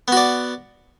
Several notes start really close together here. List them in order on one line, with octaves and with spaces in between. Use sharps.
B3 F#4 D5